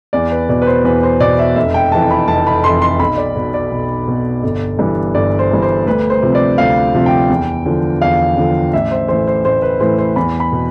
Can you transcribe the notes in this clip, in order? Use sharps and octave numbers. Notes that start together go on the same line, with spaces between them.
E2 D5
B4
B2 D5
B4
C5
E2 B4
C5
B2 D5
E5
F1 E5
G5
F2 E3 A5
B5
F1 A5
B5
F2 E3 C6
C6
B1 B5
D5
B2
D5
B1
B2
G1
G2 E3
G1 D5
C5
G2 E3
C5
D2 B4
C5
C3 F3
D5
D2 F5
C3 F3
G5
E2
D3 F3
E2 F5
D3 F3
A1 E5
C5
A2 E3 C5
C5
A1 C5
B4
A2 E3 C5
C5
E2 B5
B5
B2